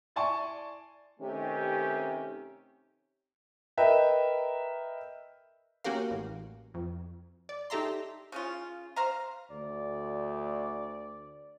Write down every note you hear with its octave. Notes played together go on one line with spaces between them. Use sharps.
E4 D5 G#5 A5 C6 C#6
C3 D#3 A3 C#4 D#4 G4
A#4 B4 D#5 E5 G5
A#3 C#4 F#4 G4 A#4 F5
A1
F2
D5
D#4 G4 A4 E5 A#5 C6
C#3 C#4 F4
C5 F5 A#5
D2 D5